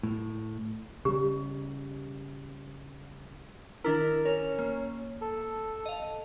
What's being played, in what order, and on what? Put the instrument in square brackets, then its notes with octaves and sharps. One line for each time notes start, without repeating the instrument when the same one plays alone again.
[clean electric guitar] A2
[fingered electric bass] C#3 G3 [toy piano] G4
[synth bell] D#3 D4 E4 [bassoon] A#4
[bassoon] C#4 [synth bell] A#4
[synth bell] A#3
[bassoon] A4
[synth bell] D#5 F5